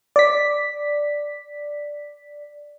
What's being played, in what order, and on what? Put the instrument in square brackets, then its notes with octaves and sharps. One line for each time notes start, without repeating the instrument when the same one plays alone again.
[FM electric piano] D5 B6